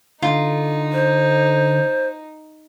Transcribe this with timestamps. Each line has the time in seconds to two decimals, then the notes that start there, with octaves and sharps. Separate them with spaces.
0.22 D3 D#4 F4
0.92 C5